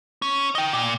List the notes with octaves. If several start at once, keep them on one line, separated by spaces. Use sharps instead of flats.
C#4
D#5 G5
A#2